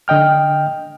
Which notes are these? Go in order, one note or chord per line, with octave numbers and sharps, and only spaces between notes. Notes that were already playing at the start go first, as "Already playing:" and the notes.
D3 D#5 G5 F6